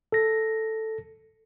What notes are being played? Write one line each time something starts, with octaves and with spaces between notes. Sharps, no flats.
A4 A#6